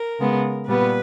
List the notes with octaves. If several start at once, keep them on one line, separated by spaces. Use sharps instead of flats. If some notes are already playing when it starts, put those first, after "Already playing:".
Already playing: A#4
C#3 G#3 B3
A#2 G3 B3 B4